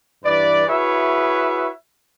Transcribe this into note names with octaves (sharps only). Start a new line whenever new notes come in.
G2 E3 B4 D5
E4 F#4 G#4 B4 C#5 E5